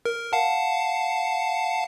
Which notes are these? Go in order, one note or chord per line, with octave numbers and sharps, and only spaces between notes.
A#4
F5 F#5 A5